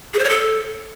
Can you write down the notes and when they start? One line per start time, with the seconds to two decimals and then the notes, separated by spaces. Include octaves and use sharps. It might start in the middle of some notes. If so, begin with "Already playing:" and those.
0.14 G#4
0.19 C5
0.24 C#5
0.29 A4